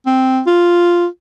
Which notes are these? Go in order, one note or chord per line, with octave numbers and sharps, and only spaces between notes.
C4
F4